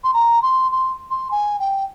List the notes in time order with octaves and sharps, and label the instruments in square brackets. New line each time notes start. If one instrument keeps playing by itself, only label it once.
[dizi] C6
A#5
C6
C6
C6
G#5
G5